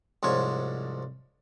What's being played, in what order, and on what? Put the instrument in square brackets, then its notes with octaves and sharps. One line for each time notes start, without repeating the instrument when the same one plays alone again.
[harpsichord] C2 G#2 F3 C#5